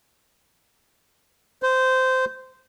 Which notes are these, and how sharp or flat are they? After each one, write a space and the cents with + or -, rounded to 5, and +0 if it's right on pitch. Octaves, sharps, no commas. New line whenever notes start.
C5 -15